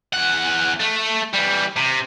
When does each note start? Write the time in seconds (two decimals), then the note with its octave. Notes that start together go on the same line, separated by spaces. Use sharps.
0.13 E2 F#5
0.80 A3
1.34 E3 G3
1.77 C3